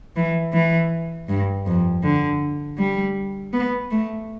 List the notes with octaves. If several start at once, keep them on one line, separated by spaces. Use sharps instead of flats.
E3
E3
G2
F2
D3
G3
B3
A3